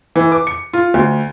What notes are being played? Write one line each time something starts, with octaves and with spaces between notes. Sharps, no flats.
E3
D6
C#7
F4
D2